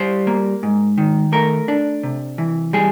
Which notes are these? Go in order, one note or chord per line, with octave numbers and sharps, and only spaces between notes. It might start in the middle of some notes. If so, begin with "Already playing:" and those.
Already playing: G3 C5
A#3
G#2
D#3
A3 A#4
D4
C3
E3
G3 G#4